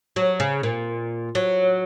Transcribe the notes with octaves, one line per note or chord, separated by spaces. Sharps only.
F#3
C#3
A#2
F#3